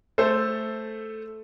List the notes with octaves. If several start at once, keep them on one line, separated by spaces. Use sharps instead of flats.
A3 A4 C5